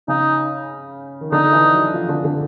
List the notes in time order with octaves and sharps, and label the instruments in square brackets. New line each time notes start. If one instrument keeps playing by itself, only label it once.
[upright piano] C#3 [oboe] D#4
[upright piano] D#3
[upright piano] D3 [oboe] D#4
[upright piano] E3
F#3
F3
D3
D3